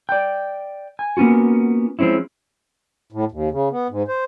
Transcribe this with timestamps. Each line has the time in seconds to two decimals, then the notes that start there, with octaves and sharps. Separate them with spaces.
0.09 D5 G5
0.99 G#5
1.17 A#3 B3 C#4 F4 F#4
1.99 F3 G#3 C4 C#4 E4
3.12 A2
3.31 D#2
3.51 C#3
3.71 B3
3.89 G#2
4.08 C5